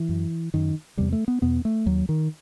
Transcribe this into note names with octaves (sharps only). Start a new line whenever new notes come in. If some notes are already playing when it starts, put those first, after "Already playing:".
Already playing: E3
F#2
F#2 D#3
E2 C3 G3
A3
B3
E2 B2 B3
A3
D#2 F#3
D#3